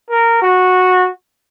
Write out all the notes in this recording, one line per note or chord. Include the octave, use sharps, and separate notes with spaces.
A#4
F#4